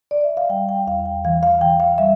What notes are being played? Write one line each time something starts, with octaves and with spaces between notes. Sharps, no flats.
D5
E5
F5
G3 G5
G5
E2 F5
G5
E3 F5
F5
E3 G5
F5
G3 E5